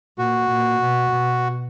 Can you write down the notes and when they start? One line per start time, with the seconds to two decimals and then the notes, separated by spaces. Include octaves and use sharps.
0.18 A#2 F#4
0.49 A#2
0.80 B2
1.10 B2